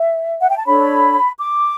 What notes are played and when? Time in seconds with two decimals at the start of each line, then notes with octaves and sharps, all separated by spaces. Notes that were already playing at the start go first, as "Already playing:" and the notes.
Already playing: E5
0.40 F#5
0.49 G5
0.58 A5
0.66 D4 A4 C#5 B5
1.39 D6